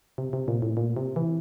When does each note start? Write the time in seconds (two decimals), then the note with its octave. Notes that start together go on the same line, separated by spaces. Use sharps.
0.18 C3
0.33 C3
0.48 A#2
0.62 A2
0.77 A#2
0.97 C3
1.16 E3